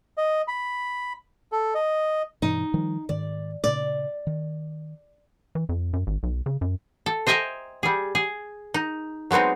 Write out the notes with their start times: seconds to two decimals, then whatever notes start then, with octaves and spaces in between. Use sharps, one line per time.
0.18 D#5
0.48 B5
1.52 A4
1.75 D#5
2.42 G2 B2 E3 D#4
2.74 D#3 F3 G3
3.09 G#2 D#3 D5
3.64 A#2 C#3 D5
4.27 D#3
5.55 E3
5.69 F2
5.93 F#2
6.07 G#1
6.23 B1
6.46 C#3
6.61 F#2
7.06 A4
7.27 C5 D#5 E5 G5 G#5 A#5
7.83 G3 G#4
8.15 G#4
8.74 D#4
9.31 F#3 G#3 B3 C4 D#4